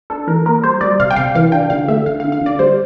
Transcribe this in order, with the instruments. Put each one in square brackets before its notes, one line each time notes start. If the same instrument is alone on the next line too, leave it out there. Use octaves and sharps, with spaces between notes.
[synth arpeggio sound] D4 A4
E3 A#4
A#3 A#4
G3 C5
G3 D5
C3 F5
G5
C3 F5
E3 F5
D4 G5
D3 F5
A3 E5
D3 F5
F5
D3
F5
D3 D5
G3 C5